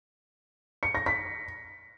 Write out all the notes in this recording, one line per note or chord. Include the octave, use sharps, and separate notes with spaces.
C#7
A#6
B6